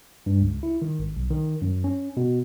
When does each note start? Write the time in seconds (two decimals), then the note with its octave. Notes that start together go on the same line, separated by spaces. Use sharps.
0.26 G2
0.42 C#2
0.63 E4
0.82 D#3
0.99 G#1
1.16 B1
1.31 D#3
1.62 F#2
1.84 C#4
2.17 B2